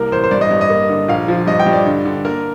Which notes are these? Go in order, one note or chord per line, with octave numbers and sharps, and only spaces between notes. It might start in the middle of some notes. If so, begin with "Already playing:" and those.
Already playing: C2 A#3 A#4
A1 C5
C5
G2 D5
D#5
G2
D#5
A#3
D3
A#1 F5
F3
G2 D#5
G5
G2
D5
D3
D3
A#3 A#4